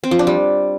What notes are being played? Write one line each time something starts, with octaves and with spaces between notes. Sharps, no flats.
C4
F3
D4
G3